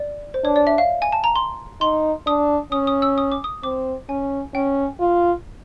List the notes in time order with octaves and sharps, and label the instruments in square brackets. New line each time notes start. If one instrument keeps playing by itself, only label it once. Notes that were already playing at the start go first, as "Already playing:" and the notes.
Already playing: [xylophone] D5
C5
[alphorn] D4 [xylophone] C#5
[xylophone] D5
E5
F5
G#5
A5
A#5
C6
[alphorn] D#4 [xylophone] C6
[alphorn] D4 [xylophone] D#6
[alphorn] C#4 [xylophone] D#6
[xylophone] D#6
E6
D#6
D6
D#6
[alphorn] C4 [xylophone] D6
[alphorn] C#4 [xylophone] G#5
[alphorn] C#4 [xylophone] G5
[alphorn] F4